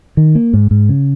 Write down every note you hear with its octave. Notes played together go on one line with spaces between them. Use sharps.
D#3
A#3
G#2
G#2
C#3